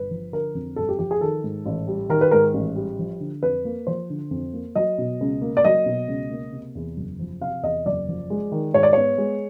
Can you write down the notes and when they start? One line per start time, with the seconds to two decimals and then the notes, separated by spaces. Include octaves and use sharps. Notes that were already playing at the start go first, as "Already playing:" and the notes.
Already playing: G1 B4
0.11 F3
0.32 D3 A#4
0.55 F2
0.76 G1 A4
0.89 G4
0.99 F3 G4
1.11 G#4
1.21 D#3 A4
1.44 G#2
1.66 A1
1.87 G3
2.09 D#3 A#4
2.21 B4
2.31 G#2 A#4
2.54 A1
2.76 G3
2.99 F3
3.20 D3
3.42 F2 B4
3.65 A#3
3.87 F3 C5
4.10 D3
4.31 F2
4.53 A#3
4.75 F#3 D#5
4.98 B2
5.21 C#2
5.42 A#3
5.57 D5
5.65 F#3 D#5
5.86 B2
6.08 C#2
6.31 A#3
6.52 C3
6.75 E2
6.97 F#1
7.19 F3
7.41 C3 F5
7.63 E2 D#5
7.86 F#1 D5
8.08 F3
8.30 G#3
8.52 D#3
8.74 G#2 C#5
8.83 D5
8.93 B3 C#5
9.18 G#3